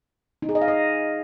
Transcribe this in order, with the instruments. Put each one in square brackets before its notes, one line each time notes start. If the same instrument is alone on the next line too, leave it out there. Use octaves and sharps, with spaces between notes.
[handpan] D#4
G#4
D#5
F5
D#5